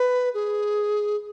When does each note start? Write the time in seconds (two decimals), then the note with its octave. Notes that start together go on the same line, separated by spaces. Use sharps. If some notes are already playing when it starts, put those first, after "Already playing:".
Already playing: B4
0.34 G#4